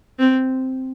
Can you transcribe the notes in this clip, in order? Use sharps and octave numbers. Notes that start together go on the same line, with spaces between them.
C4